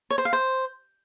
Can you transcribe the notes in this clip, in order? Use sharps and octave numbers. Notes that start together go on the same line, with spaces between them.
C#5
C5
F5
C5